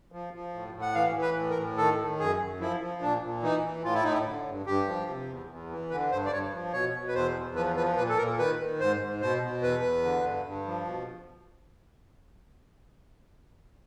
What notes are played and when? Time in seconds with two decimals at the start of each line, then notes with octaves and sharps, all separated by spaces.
0.12 F3
0.33 F3
0.53 A2
0.74 A2
0.81 F#5
0.95 E3 F5
1.16 E3
1.22 B4
1.36 A2
1.50 A#4
1.57 A2
1.77 D#3 A4
1.98 D#3
2.19 F#2 G#4
2.40 F#2
2.60 F3 E4
2.80 F3
3.01 A#2 D4
3.22 A#2
3.42 E3 D#4
3.63 E3
3.83 A2 F4
3.94 E4
4.03 A2 D#4
4.13 E4
4.25 D3
4.46 G2
4.66 G2 G4
4.87 F3
5.08 C3
5.28 E2
5.50 E2
5.70 E3
5.90 D3 B4
6.11 G2 C5
6.26 D5
6.32 G2 C#5
6.52 F3
6.73 B2 C#5
6.94 B2
7.07 B4
7.14 E2 C5
7.36 E2
7.55 F3 B4
7.76 F3 B4
7.97 A#2 B4
8.09 A4
8.17 A#2 A#4
8.38 D#3 B4
8.59 D#3
8.80 G#2 C5
9.00 G#2
9.21 B2 C5
9.42 B2
9.62 E2 B4
9.83 E2
10.04 D3
10.25 G2
10.45 G2
10.66 F3
10.86 B2